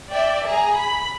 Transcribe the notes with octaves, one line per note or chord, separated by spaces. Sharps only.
D5 E5 G5
G#4 A#5
B5